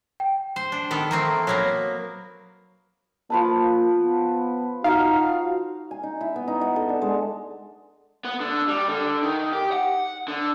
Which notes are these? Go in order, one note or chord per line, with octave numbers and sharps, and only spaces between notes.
G5
C5
D4
D#3 B3 A4
A3 A#3 C4 A#5
F#3 A#3 B3
F3 A#3 B4 A5
B3
D#4 F#4 F5
G#5
D#4
E4
B3
D#4
F#5
A4
D4
G#3
B3
D3
G3
D3
D#3
G4
F#5
D3